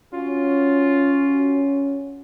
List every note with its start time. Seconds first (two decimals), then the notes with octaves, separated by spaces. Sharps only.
0.13 C#4 F4 F#4